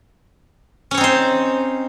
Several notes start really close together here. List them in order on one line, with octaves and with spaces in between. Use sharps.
C#4 C#5 C4 D#4 C5